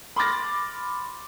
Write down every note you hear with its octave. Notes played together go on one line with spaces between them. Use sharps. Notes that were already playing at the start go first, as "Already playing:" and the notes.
B5 C6 D6 F6 A6 A#6